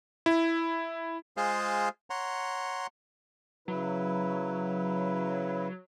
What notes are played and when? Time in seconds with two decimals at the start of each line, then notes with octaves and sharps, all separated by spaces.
0.26 E4
1.37 G#3 F4 G#4 C5 F5
2.10 C#5 F#5 A#5 C6
3.68 C#3 F#3 E4 B4